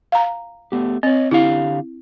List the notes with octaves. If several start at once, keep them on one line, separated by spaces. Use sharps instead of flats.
F5 A#5
A3 B3 G4
C4 C#5 D#5
D3 E4 G4 F5